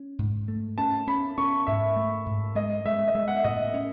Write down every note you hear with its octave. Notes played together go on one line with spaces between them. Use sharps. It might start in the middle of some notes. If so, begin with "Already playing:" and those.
Already playing: C#4
G#2
A3
C#4 A5
C#4 B5
C#4 C#6
G#2 E5
A3
G#2
G#3 D#5
G#3 E5
D#5
G#3 E5
F#5
E5
A2 D#5
C#4